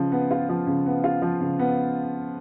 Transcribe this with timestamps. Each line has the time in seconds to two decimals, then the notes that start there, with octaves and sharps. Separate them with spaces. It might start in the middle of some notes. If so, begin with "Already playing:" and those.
Already playing: C#3 F3
0.12 B3
0.31 F4
0.49 F3
0.67 C#3
0.86 B3
1.04 F4
1.22 F3
1.41 C#3
1.59 B3